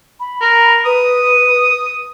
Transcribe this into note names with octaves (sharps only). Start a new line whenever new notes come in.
B5
A#4
B4 D#6